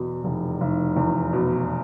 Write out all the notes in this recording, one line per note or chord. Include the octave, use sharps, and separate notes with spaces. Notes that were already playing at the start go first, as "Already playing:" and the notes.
Already playing: E2 B2
F1
F1
E2
B2